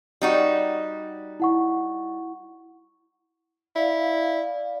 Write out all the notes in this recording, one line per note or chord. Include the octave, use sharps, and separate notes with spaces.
G3 D#4 F#4
E4 F#5 C#6
E4 D5 F5